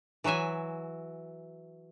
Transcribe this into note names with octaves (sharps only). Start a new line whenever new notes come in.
E3 F#3 F#4 E5 G#5